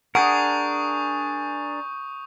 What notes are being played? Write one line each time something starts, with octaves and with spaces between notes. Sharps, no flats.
D4 G#4 A#4 F#5 C#6 D#6 G6